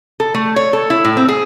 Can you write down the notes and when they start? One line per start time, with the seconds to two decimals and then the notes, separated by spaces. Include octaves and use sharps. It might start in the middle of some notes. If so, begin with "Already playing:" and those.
0.20 A4
0.34 A3
0.56 C#5
0.73 A4
0.90 E4
1.05 A2
1.17 C4
1.29 G#4